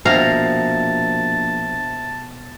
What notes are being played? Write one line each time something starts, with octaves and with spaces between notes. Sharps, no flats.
A#1 B2 C5 E5 F5 G5 A5 A#5